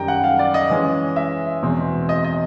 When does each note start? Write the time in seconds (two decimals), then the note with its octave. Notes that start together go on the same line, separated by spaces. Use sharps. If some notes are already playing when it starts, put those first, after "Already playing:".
Already playing: F#2 D#3 G3 G5 A#5
0.08 F#5
0.24 F5
0.39 D5
0.54 D#5
0.70 E3 G#3 C#4
1.16 E5
1.63 E2 B2 G#3 C4
2.09 D#5
2.24 D#5